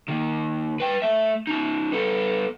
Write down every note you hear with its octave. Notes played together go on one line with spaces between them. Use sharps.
D#2 D#3
B4 G5
A3 E5
C#4 D#4
B3 A4